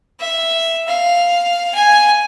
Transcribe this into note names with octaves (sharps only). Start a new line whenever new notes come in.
E5
F5
G#5